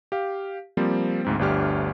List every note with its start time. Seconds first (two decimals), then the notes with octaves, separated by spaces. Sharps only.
0.12 G4 F5
0.77 F3 G3 A#3 C4
1.25 D2 G#2 C4
1.39 G1 D2 D4 G4 F6